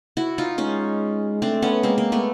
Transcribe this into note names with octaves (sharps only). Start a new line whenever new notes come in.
E4 F#4
D#4 F4
G#3 C#4 D#4
A3 C4 D4
B3 C#4
G#3 A#3 C4
A#3
A3 B3